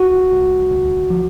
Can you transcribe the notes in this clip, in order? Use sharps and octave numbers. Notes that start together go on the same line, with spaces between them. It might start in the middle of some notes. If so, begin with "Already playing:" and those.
Already playing: C2 F#4
C2
D2
F3